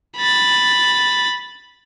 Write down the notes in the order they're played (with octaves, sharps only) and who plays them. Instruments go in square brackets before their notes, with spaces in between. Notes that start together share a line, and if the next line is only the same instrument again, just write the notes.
[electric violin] B5 A6